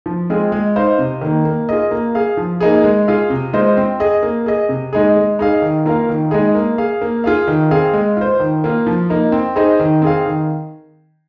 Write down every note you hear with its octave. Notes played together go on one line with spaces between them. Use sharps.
F3
G#3 C4 F4 G#4
G#3
D#4 C5 F5
C3
D#3 A#3
A#3
F4 G#4 D#5
A#3
G#4 F5
F3
A#3 D#4 G#4
G#3
F4 G#4 F5
C3
G#3 F4 C5 D#5
C4
G#4 D#5
A#3
G#4 D#5
C3
G#3 D#4 G#4
G#3
D#4 G#4 F5
D#3
A#3 F4 A#4 F5
D#3
G#3 D#4 G#4
A#3
G#4 F5
A#3
F4 G#4 F5
D#3
C4 G#4 F5
G#3
F4 C5
D#3
A#3 F4
F3
A#3 D#4
C4
D#4 G#4 C5 D#5
D#3
C4 G#4 F5
D#3